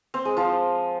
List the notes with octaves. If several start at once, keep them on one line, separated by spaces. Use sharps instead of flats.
C4
G#3
F3